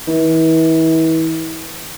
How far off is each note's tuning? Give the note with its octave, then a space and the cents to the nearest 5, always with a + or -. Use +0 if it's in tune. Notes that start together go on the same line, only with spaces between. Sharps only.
E3 -35